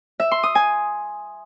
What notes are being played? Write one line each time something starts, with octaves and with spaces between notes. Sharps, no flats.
E5
C6
D#6
G#5